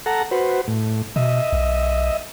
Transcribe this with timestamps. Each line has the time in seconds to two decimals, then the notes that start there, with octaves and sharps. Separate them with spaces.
0.06 A4 F#5 A#5
0.31 F#4 B4 C5
0.68 A2
1.16 B2 D#5 E5
1.52 B1